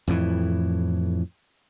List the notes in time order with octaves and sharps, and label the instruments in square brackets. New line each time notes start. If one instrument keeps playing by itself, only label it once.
[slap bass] F2 A2 E3